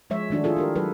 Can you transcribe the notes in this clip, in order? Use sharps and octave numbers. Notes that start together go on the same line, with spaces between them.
F3 G#3 C#5 E5
D#3 A3 D4 D#4 F#4
E4 F4 G#4 A4
D4 G4 A#4
F#3 A4 B4